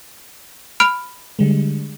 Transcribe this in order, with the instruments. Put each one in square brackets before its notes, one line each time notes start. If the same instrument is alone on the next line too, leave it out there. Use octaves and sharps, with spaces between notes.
[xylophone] B5 F6 D7
[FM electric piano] D3 G3 G#3